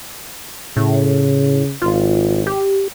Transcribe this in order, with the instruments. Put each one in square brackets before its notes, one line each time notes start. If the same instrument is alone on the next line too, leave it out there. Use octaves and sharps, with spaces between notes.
[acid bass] A2 [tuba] C#3
[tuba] G#1 [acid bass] F4
[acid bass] G4